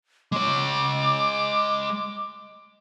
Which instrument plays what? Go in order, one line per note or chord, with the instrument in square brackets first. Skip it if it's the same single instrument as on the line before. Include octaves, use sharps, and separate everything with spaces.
[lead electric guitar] G#3 C#5 [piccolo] D6